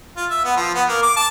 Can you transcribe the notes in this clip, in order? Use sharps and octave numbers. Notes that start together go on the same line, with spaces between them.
F4
E5
B3
F3
B3
A#3
D6
A5